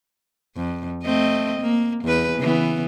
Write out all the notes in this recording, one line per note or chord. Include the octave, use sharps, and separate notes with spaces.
F2
A3 C4 D#5
A#3
E2 B4
C#3 E3 B3